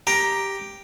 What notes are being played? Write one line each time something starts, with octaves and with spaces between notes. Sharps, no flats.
G4 A#5